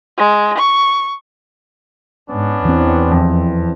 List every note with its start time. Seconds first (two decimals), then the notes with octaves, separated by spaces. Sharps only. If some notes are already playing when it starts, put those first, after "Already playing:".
0.18 G#3
0.58 C#6
2.30 G#2 B3 C#4 D4
2.65 E2 E3 C4
3.11 F2